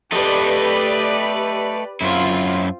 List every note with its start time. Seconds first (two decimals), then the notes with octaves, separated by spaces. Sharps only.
0.12 A3 G4 A4 B4 D5 D#5
2.01 F#2 C4 E4 F4